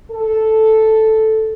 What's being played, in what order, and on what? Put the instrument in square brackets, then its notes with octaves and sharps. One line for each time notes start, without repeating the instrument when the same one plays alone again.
[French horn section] A4